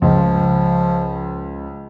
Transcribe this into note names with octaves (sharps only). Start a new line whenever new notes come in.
C#2 F3